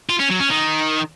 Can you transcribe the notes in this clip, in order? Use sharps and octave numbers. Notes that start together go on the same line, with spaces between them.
F4
C#4
F#3
C#4
D#3